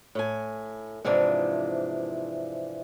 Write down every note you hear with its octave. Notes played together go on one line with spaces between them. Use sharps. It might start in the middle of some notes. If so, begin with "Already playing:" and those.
A2 G#5
G#2 C3 E3 F3 D4